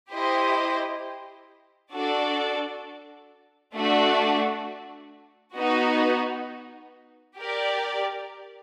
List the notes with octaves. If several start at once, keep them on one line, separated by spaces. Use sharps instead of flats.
E4 G4 C5 D#5
D4 F#4 A4 D5
A3 D4 F#4
B3 D#4 F#4
G4 A#4 D5